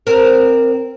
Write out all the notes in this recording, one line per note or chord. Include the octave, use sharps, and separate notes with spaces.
C4 A#4